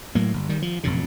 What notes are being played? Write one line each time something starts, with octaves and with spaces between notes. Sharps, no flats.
A2 F#3 A#3
G1
D#3 G3
F3
E1 F2 A#2 C#3